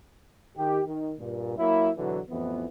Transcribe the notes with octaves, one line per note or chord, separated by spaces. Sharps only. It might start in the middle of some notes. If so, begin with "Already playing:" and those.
D#3 G4
D#3
G2 A#2
F#3 A#3 E4
E2 B2 D3 E3 F#3
A1 F2 E3 B3